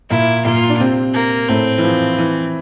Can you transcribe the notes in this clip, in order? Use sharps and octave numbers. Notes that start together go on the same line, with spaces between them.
A#2 A#3 E4
A#2 A#3 F4
D4
C3 C4
A#3
A2 A3 C4
E3
F3
E3